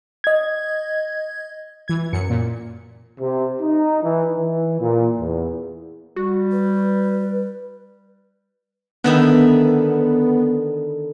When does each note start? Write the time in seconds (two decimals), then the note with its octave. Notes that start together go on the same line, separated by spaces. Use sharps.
0.24 D#5 G#6
1.88 E3 G#6
2.13 F#2 C#7
2.30 A#2
3.20 C3
3.61 D#4
4.03 E3
4.37 E3
4.80 A#2
5.19 E2
6.16 G3 F#4
6.52 B4
9.04 D3 D#3 B3 E5